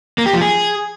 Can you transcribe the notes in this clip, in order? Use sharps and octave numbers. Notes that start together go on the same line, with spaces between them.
A#3
G4
F3
G#4